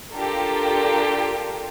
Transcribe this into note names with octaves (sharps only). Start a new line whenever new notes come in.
D4 F4 G4 A4 A#4